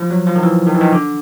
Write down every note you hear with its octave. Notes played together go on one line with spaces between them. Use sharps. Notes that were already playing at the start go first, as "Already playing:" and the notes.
Already playing: F3
F#3
F3
D#3
E3
D#3
E3
D#3
D3